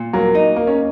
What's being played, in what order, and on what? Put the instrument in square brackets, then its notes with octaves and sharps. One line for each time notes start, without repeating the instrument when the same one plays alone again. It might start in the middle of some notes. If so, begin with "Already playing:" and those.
Already playing: [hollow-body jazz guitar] A#2
[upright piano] F#3 A#3
[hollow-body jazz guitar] D#4
[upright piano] A#3
C#4